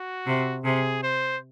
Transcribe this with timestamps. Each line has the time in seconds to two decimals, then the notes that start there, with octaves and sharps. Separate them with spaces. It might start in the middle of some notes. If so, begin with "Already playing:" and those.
Already playing: F#4
0.26 C3
0.64 C3 G#4
1.03 C5